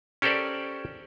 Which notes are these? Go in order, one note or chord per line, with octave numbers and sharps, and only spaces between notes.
C#4 G4 A4 A#4 C5 D5